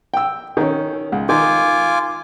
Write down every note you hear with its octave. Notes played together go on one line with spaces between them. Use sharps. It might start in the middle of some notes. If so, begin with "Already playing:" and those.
G5 E6
D#3 C#4
C#2
D#3 F4 G#5 D6